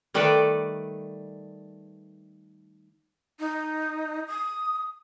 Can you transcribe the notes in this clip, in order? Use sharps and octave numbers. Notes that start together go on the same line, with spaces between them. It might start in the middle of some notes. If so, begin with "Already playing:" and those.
D#3 G3 A3 A4 B4 D5
D#4
D#6